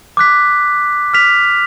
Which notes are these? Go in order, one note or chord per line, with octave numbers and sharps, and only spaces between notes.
D6 F#6 B6
F6 B6 F7